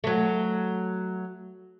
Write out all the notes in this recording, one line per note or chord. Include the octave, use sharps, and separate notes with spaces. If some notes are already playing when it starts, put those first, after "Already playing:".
F#3 A3